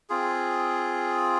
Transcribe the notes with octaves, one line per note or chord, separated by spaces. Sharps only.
C4 F4 G#4